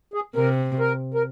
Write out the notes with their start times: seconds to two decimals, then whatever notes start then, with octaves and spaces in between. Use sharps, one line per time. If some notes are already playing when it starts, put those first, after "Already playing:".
0.14 G#4
0.36 C3 A#4
0.80 A#4
1.14 A#4